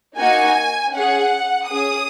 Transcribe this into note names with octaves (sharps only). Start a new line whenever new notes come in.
A#3 D#4 F#4 G#5
C#4 G#4 F#5
C#4 G#4 D#6